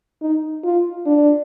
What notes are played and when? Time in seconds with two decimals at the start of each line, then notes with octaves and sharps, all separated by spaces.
0.21 D#4
0.64 F4
1.06 D4